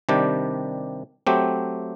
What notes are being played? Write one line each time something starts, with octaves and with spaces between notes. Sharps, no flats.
C3 D#3 G3 D4 G4
F#3 A3 C4 G4